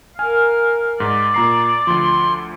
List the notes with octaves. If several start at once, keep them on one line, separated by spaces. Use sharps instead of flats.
A#4 F5 G#5 F6
G#2 D5
A#2 A#5 C7
D2 F3 C6